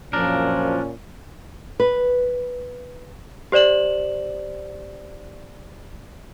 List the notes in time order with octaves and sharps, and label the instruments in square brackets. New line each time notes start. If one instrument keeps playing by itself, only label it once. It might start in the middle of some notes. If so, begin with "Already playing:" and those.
[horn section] F#2 F3 [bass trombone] A#2 [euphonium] C#4 [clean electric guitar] D4 A#4
[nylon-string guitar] B4
[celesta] G4 C5 D5 E7 F#7